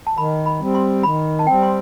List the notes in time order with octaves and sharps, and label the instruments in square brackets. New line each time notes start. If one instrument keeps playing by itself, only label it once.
[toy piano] A5
[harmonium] D#3 [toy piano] B5
[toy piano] B5
[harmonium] G3 C4
[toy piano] C6
[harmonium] D#3 [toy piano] B5
[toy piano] A5
[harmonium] G3 C4 [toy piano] G5
[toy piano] C6